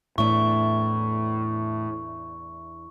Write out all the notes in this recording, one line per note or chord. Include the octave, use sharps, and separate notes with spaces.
E2 A2 A3 D4 E4 C#6